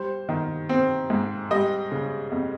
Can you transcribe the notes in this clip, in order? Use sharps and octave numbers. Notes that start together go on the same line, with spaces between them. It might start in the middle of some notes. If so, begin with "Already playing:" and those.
Already playing: G3 C5
D#3
C4
G#2
G3 D#5
C#3
F2